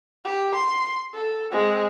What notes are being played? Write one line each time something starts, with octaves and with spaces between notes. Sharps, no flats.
G4
C6
A4
G#3 C4